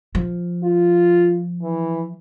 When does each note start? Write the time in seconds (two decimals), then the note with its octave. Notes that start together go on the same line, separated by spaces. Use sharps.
0.15 F3
0.64 F4
1.62 E3